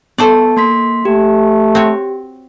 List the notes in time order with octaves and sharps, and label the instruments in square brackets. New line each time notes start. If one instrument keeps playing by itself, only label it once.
[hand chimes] B3 A5 [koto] A4 C5 D5
[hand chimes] A#3 C6 B6
[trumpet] A3 [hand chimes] G4
[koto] C4 F#4 C#5